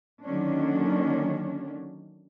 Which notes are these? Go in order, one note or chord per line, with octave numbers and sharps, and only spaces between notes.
D3 D#3 F#3 A#3 C#4 D4